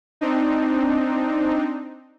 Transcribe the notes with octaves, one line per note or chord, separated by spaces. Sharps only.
C4 D4 D#4